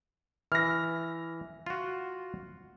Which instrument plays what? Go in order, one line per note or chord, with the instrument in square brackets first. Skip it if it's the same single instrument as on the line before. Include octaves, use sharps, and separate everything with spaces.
[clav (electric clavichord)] E3 [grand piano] F6 A#6
[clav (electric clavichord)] F4 F#4